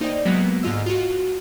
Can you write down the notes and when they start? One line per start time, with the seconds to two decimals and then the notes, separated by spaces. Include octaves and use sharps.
0.01 A#3 D#4 C5 D5 D#5 G5
0.25 C3 F#3 G#3 A#3 B3
0.62 G#2 D3 F4 D#5 E6 F6
0.86 F4 F#4